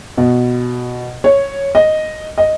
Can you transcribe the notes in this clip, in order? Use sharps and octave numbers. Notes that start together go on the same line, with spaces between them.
B2
C#5
D#5
D#5